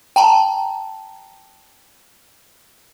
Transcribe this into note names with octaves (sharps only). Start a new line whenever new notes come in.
G5 A5 A#5